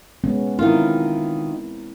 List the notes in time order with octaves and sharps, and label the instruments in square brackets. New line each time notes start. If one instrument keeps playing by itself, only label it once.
[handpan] G#3 B3 C#4
[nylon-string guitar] D#3 F4 [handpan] C4 E4 A#4